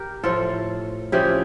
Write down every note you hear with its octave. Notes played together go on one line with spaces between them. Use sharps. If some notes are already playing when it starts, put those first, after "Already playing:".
Already playing: G4 A#4
A2 F3 F4 A4
C#3 F3 E4 G4